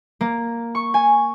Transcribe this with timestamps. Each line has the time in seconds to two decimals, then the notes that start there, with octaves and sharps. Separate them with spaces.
0.21 A#3
0.75 C#6
0.94 G#5